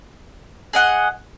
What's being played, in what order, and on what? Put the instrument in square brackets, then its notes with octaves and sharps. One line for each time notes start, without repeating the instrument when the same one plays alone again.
[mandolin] G#4 D#5 F#5